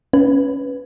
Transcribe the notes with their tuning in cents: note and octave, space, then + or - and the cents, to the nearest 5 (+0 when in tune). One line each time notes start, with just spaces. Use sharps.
C#4 +0 B4 +0